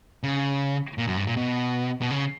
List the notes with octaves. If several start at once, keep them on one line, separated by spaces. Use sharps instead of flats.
C#3
A#2
F#2
G2
A#2
B2
B2
C#3